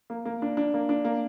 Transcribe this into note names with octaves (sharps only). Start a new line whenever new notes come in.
A#3
A#3
D4
D4
A#3
D4
A#3